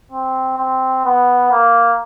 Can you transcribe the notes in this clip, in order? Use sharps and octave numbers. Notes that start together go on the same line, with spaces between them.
C4
C4
B3
A#3